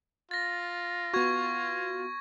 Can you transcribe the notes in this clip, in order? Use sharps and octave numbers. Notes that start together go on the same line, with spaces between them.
F4 A6 A#6
B3 F#4 C#6 G#6